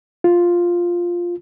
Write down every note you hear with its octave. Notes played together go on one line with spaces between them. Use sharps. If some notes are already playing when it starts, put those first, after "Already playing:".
F4